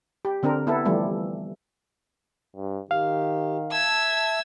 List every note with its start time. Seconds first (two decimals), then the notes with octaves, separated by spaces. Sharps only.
0.25 G4
0.43 D3 C4 D4 A#4
0.67 B3 E4 A4
0.85 E3 F3 G3 A3
2.56 G2
2.91 D#3 G4 F5
3.72 E5 A5 E6 G#6